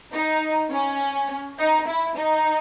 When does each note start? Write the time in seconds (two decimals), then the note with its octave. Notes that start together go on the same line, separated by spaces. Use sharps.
0.14 D#4
0.71 C#4
1.59 D#4
1.88 E4
2.16 D#4